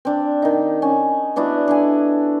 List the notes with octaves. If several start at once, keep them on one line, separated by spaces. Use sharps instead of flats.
C4 D4
D#3 D#4
C#4
B3 D4 E4 F#4
D4 A4 G#5